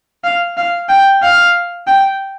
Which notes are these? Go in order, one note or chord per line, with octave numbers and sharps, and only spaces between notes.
F5
F5
G5
F5
G5